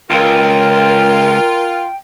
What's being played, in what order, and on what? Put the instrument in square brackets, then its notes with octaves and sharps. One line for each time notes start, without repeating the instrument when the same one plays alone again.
[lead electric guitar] C#2 [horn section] F4 [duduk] A#4 [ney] G5